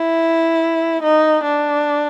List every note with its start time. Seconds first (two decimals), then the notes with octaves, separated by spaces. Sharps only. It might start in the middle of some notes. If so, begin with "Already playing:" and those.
Already playing: E4
1.03 D#4
1.44 D4